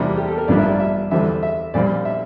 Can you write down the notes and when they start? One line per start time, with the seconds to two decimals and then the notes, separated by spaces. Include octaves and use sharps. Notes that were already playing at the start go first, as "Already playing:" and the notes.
Already playing: E2 C3 G3 A#3 D4 F4
0.17 G4
0.28 A4
0.38 A#4
0.48 A1 G2 F3 A#3 D4 D5
0.59 E5
0.69 D5
0.80 E5
1.11 E2 D3 G3 C4 E5
1.43 E5
1.74 A#1 A#2 G3 C4 D5
2.05 E5